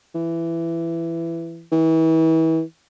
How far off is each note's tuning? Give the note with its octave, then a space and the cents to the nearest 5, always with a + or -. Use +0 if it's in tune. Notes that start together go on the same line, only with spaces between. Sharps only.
E3 +15
E3 -35